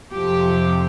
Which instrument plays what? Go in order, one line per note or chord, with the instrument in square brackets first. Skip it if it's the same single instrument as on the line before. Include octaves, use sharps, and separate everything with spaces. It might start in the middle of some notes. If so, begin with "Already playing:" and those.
[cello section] F2 C3 F3 G4